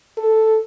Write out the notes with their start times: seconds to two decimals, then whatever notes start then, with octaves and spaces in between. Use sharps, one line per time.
0.17 A4